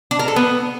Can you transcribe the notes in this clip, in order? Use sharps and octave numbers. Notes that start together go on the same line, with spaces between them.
D4
A#4
A4
B3